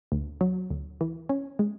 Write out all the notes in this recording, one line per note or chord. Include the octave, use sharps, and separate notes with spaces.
D2
F#3
D2
E3
C#4
G#3